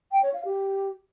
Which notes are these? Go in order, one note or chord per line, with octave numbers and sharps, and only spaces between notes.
G5
C#5
F5
G4